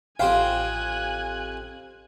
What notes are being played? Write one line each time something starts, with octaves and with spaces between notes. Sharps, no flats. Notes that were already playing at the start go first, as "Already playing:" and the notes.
A1 F2 G4 C5 F5 G5 G#5 F#6